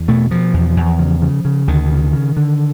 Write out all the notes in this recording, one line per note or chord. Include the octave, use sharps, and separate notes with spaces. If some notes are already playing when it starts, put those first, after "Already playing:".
Already playing: E2
B2 A3
B2 F3
E2
E2
C#3
C#3
C#3
D2 D#3
C#3
C#3
D3